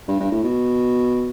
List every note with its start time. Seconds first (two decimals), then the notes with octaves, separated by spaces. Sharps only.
0.08 G2
0.20 G2
0.31 A2
0.43 B2